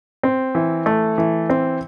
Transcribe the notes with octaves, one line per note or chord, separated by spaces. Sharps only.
C4
E3
A3
E3
C4